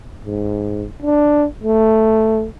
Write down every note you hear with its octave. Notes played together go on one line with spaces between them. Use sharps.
G#2
D4
A3